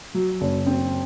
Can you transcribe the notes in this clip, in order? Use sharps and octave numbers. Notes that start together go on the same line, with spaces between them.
F#3
F#1
C4